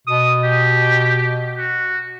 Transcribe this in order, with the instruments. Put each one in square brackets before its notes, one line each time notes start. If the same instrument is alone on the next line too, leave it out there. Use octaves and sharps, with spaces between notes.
[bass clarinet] B2 [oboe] D#6
[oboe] G4
F#4